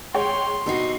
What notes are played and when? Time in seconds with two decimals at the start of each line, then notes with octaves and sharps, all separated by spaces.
0.14 G#3 C#5 G5 C6
0.66 C3 B3 D#4 F#4 C7